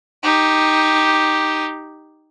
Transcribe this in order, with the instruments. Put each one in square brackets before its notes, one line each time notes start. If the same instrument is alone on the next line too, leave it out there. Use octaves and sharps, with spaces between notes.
[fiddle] D#4 G4